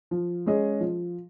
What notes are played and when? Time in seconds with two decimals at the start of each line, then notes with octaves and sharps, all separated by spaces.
0.11 F3
0.46 G#3 C#4 G#4 D#5
0.80 F3